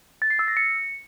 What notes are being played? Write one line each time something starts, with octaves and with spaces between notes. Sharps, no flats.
A6
C7
E6
A#6
C#7